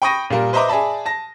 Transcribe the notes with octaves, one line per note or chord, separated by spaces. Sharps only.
G5 B5 C#6 D#6 A#6 D#7
A#2 G3 A#3 A#4
B4 C5 D#5 E5 A#5 D6
G#4 D5 E5 A5 B5
A5 A#6